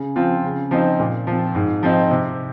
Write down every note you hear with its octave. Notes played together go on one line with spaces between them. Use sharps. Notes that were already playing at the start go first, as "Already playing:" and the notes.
Already playing: C#3
F3 C4 F4
C#3
F3 C4 D#4
A#2
F3 C4
G#2
F3 C4 D#4
C3